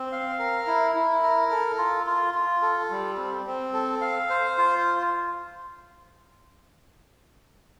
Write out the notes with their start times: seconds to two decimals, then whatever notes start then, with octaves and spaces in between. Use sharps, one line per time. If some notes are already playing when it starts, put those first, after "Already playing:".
Already playing: C4
0.12 F5
0.39 A#4
0.67 E4
0.96 E4
1.23 A#4
1.51 A4
1.78 F4
2.07 F4
2.34 F4
2.62 A4
2.91 G3
3.17 C4
3.46 C4
3.74 A4
4.01 F5
4.30 C5
4.58 F4